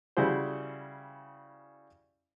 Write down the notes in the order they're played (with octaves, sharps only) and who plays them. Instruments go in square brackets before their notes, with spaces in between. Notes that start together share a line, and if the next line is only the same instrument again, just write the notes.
[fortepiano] C#3 G3 E4 F#4 G#4 C5